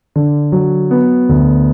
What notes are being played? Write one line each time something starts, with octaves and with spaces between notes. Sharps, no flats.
D3
F#3
B3
D2